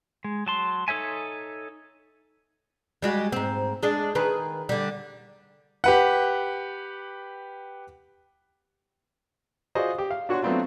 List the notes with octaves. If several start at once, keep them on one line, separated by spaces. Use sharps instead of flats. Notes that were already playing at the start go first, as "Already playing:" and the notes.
G#3
F#3 A5 C6
D#4 A4 C#5 E5 G#5
G3 G#3 F#4
G#2 C4
G#3 D4
D#3 G#4 B4
D3 G3
G4 B4 F#5
F4 F#4 G#4 C5 D5 D#5
G4
F5
D4 F#4 C#5 F#5 C6 C#6
F#3 A3 B3 C4 D4 F4